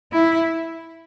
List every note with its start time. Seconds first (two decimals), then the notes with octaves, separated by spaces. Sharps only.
0.12 E4